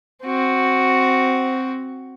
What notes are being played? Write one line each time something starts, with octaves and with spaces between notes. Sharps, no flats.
C4 F#4